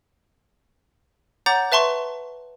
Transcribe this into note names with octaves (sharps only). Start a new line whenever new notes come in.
C#5 F#5 A#5 D6 G6 A6
B4 E5 A5 C6 C#6